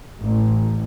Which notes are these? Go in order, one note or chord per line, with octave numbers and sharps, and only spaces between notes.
A1